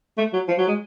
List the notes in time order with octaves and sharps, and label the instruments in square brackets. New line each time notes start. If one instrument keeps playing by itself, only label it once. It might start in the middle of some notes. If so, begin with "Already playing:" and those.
[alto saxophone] A3
F#3
F3
F#3
G#3